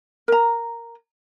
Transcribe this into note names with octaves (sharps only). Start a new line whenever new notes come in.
A#4 A#5